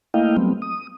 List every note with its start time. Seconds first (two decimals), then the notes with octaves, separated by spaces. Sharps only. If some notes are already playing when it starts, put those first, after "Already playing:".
0.14 A3 A#3 E4 D#5 F5 G5
0.37 F#3 G3 A3 B3 C4
0.62 D#6